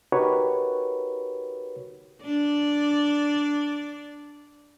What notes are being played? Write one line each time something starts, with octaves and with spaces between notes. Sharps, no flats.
D#4 F#4 G4 A#4 B4 C#5
D4 D5